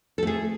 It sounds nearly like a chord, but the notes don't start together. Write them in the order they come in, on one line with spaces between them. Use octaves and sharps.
A4 A3 G#4